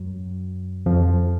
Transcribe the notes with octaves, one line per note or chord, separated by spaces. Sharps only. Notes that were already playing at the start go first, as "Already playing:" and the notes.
Already playing: F#2 F#3
F2 F3